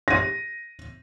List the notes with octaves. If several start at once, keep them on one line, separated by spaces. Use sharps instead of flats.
A#6 D#7